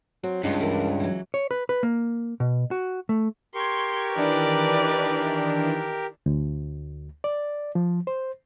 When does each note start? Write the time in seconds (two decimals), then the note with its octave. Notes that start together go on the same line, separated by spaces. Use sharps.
0.24 F#3 C4
0.43 C#2 G2 D#4 F4
0.60 E3 F3 A#4
1.00 E3 F#3
1.34 C#5
1.51 B4
1.69 B4
1.83 A#3
2.40 B2
2.71 F#4
3.09 A3
3.54 G4 A#4 C6 C#6 G#6
4.16 D#3 E3 D4 B4 D5
6.26 D2
7.24 D5
7.75 F3
8.07 C5